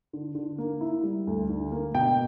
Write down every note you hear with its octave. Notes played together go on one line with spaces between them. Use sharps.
D3
D3
A#3
E4
G3
D2
D3
A#3
B2 G5